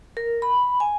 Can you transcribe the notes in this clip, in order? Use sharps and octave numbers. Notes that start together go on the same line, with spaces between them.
A#4
B5
G#5